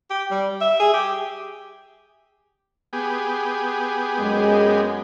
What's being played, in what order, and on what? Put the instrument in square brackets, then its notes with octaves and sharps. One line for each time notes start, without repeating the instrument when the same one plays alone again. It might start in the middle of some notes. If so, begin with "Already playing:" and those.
[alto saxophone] G4
G3
E5
G#4
G4
[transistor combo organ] B3 G4 G#4
[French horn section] F#2 G#3